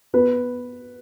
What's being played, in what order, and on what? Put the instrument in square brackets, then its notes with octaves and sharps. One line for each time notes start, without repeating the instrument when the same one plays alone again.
[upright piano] B3 B4